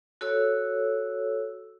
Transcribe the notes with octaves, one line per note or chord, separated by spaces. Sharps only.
F#4 A4 C#5 E6